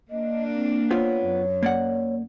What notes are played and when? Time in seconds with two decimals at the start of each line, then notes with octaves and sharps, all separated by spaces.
0.11 A#3 D4 D#5
0.54 C4
0.91 B3 C4 F4 C#5
1.26 F#2
1.63 A#3 D5 F#5